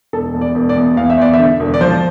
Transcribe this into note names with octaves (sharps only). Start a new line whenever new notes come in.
E1 A4
E2
D5
E1
D5
E2
E2 F5
E5
E2 D5
E5
D3
E1
D5
F3 C5